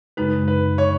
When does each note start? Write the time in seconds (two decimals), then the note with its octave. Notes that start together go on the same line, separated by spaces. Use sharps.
0.17 F#2 C#3 G#3 D#4 B4
0.48 B4
0.78 C#5